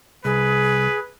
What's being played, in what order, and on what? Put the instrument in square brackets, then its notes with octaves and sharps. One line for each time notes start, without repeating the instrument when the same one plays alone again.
[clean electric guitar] C2 [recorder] G#4 [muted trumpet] B4